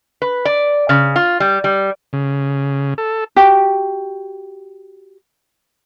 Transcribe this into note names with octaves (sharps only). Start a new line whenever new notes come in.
B4
D5
C#3
F4
G3
G3
C#3
A4
F#4 G4